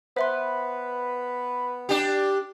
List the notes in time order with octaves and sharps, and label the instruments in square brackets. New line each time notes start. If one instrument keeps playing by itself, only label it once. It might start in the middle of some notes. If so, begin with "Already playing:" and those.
[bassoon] B3 [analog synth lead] B4 [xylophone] C5 E5 C6
[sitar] D4 G4